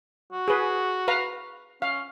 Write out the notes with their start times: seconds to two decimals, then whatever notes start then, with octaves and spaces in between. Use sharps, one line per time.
0.33 F#4
0.48 G#4 B4
1.08 B4 F5 A#5
1.82 C#4 F5